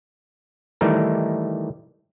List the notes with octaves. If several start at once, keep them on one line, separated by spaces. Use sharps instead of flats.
D#3 E3 G3 A3 D#4 A#4